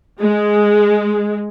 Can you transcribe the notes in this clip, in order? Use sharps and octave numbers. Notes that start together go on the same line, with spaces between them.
G#3